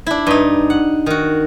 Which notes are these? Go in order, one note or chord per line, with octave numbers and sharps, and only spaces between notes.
D4 E4
G2 D#4
F#5
D#3 F#4